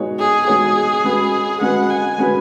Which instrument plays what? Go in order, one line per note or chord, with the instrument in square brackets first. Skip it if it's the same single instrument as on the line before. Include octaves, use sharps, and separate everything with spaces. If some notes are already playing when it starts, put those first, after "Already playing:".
Already playing: [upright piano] G#3 B3 D#4 F#4 C#5
[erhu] G#4
[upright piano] G#3 B3 D#4 F#4 C#5 [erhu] G#4
[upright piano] G#3 C#4 F#4 B4
[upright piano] G#3 C#4 F#4 B4 [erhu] F#5
[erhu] G#5
[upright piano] G#3 C#4 F#4 B4